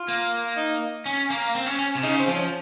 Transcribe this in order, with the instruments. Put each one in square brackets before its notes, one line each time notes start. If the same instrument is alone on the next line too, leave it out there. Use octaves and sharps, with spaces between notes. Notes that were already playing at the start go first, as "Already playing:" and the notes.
Already playing: [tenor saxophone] F4
[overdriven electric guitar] A#3
[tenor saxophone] D#4
[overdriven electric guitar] C#4
A#3
C4
C#4
C#4
C3
[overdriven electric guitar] C#3 [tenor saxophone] D#4
[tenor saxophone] C4
[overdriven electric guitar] F3
[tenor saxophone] C#4